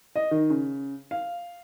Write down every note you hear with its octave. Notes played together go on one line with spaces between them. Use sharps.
D#5
D#3
C#3
F5